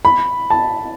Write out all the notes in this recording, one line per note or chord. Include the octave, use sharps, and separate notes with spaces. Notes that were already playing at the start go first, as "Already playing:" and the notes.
B5
A5